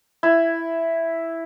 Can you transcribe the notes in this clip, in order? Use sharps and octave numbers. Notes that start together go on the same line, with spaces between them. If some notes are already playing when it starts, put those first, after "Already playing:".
E4